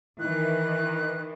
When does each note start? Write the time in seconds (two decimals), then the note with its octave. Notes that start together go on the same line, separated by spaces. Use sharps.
0.20 D#3 E3 E4 A#4 F#6